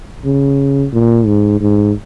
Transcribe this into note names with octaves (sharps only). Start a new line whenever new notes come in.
C#3
A#2
G#2
G#2